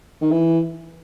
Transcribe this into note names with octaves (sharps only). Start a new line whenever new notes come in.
D#3
E3